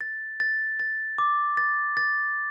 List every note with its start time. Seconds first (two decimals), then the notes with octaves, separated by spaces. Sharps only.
0.01 A6
0.40 A6
0.80 A6
1.18 D6
1.57 A6
1.97 A6